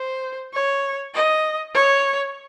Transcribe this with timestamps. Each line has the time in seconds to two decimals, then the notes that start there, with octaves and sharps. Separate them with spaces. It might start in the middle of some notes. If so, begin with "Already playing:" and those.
Already playing: C5
0.54 C#5
1.14 D#5
1.74 C#5